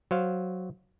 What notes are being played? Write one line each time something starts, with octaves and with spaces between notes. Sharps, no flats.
F#3 C5 F5